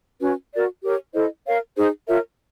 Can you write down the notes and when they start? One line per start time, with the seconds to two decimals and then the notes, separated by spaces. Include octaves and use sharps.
0.21 C#4 F#4 B4
0.53 F#4 A#4 D5
0.83 G4 A#4 C#5
1.14 E4 A4 C5 D#5
1.46 A#4 C#5 F5
1.76 D#4 G#4 C5
2.07 F4 A#4 C#5 E5